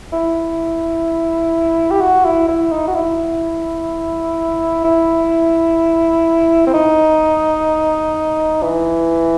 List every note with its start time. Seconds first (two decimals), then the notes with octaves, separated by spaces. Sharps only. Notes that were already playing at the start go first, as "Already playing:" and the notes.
0.13 E4
1.91 G4
2.01 F#4
2.25 E4
2.48 E4
2.72 D#4
2.88 F#4
2.95 E4
4.84 E4
6.67 C4
6.74 D#4
8.63 E3